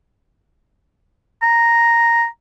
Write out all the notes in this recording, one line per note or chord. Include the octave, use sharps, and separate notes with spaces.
A#5